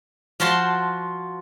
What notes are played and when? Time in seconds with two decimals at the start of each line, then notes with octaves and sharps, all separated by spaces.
0.40 F3 F4 F#4 C5 A5 C6